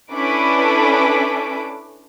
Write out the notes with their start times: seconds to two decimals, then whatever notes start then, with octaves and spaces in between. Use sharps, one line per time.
0.12 C#4 D4 E4 A4 B4 D6